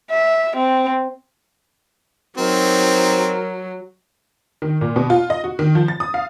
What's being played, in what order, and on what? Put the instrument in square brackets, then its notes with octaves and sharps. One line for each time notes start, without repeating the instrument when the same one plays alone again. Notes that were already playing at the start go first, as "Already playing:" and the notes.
[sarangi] E5
C4
[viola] F#3 [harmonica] C4 D#4 [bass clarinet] A#4
[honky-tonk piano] D#3
A#2
B2
F4
D#5
F#4
D#3
F3
A6
D#6
F5